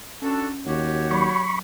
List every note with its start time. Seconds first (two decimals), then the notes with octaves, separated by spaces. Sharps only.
0.22 C#4 D4 F#4 A4
0.66 D#2 F#4 G4 C#5
1.11 F#3 B5 C#6